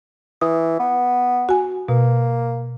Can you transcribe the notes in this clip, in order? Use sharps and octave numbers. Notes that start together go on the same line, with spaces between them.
E3 D#6
B3
F#4 G#5
B2 A#3